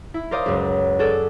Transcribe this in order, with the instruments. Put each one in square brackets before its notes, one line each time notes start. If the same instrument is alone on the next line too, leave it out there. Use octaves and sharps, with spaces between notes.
[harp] E4
A#4 C5 D5 F5 D#6
C#2 F#2
F#4 G#4 A4 D5